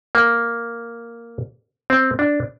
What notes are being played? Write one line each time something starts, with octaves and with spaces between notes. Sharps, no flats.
A#3
C4
D4